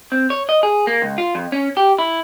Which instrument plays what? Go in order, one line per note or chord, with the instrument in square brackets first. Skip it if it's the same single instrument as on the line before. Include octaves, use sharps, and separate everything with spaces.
[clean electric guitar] C4
C#5
D#5
G#4
A#3
C#2
F4
F2
C#4
G4
E4